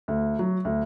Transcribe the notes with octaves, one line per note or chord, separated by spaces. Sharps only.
D2
F#3
D2